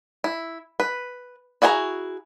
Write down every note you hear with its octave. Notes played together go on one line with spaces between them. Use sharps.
E4
B4
E4 F#4 G#4 C5 A#5